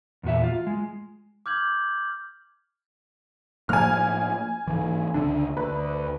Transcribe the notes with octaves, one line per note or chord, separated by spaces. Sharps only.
E2 A#2 F#4 E5
F4
G#3
D6 F6 G6 G#6 F#7
A2 F3 A#3 G#5 F6
G#2 E3
C#2 D3 D4
D2 B4